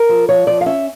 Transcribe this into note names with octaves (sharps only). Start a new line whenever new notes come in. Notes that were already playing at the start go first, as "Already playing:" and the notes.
Already playing: A#4
F3
F3 C#5
F3 D5
F5
C#4 E5